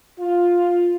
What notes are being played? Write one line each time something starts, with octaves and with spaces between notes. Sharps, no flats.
F4